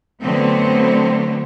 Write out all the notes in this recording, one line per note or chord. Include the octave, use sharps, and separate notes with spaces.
D3 F#3 A3 B3 C4